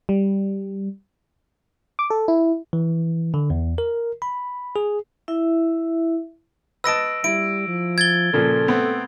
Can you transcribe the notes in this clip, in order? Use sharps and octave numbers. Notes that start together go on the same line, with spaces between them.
G3
D6
A4
E4
E3
D3
E2
A#4
B5
G#4
E4 E5
B4 D#5 A5 E6 A#6 D7
G3 E4 D7
F3
G#6 A6 G7
A#2 C#3 F3 A4
A3 B3 C4